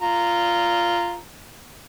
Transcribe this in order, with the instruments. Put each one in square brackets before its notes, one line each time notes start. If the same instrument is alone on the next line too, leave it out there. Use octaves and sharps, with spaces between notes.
[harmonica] F4 A#5